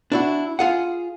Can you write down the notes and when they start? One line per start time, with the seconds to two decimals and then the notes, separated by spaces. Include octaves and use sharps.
0.12 D4 E4 F#4
0.59 F4 G#4 F#5